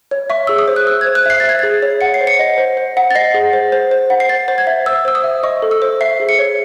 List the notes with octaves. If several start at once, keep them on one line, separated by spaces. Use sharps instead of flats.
C#5
E5 C#6
G#4 E6
D#6
C5
F#6
C5 E6
G#6
C5
F#6
E5 C7
E5 A6
G#6
G#4 A6
C#5
F#5 C#7
C7
C5
C#7
D#5
C5
C5
F#5
A6
D#5 C7
G#4
C5
C5
C5
F#5
C7
C5 A6
C5
G#6
E5
C5 E6
C5 E6
D#6
E5
D#5 C#6
A4
E6
C5
E5 C7
G#4
C#7
C#5